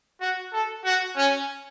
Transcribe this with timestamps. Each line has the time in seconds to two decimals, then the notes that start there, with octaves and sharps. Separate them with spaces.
0.21 F#4
0.53 A4
0.85 F#4
1.16 C#4